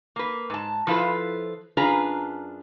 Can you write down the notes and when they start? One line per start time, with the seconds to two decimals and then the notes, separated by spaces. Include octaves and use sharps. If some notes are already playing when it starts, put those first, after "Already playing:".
0.16 A#3 B4
0.50 G#2 A5
0.87 F3 E4 F4 A4 B4
1.77 F#2 D4 F4 G#4 B4 A#5